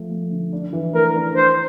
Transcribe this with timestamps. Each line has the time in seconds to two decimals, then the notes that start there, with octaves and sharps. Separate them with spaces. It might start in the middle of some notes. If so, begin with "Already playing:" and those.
Already playing: F3 A3
0.11 A3
0.31 D3
0.53 D4
0.73 E3
0.94 A3 A#4
1.15 D4
1.35 D4 C5